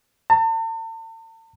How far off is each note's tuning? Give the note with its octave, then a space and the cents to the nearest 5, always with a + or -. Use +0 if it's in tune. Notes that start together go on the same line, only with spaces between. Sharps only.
A5 +40